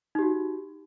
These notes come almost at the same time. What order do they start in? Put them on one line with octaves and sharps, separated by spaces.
D#4 G4 F#4